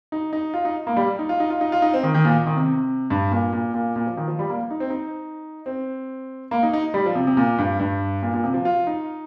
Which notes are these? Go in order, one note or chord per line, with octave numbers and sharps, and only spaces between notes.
D#4
D#4
F4
D#4
A#3
G3
D#4
F4
D#4
F4
D#4
F4
D#4
C4
D#3
D#3
A#2
D#3
C3
G2
A#2
A#2
A#2
A#2
F3
D#3
F3
G3
A#3
D#4
C4
D#4
C4
A#3
D#4
D#4
G3
F3
C3
C3
A#2
G2
G2
A#2
A#2
C3
F3
F4
D#4